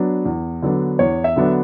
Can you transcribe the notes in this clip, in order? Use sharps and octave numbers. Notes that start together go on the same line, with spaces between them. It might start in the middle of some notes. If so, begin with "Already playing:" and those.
Already playing: F#3 B3 D4
E2
D3 F#3 B3 D4
E2 C#5
E5
D3 F#3 B3 D4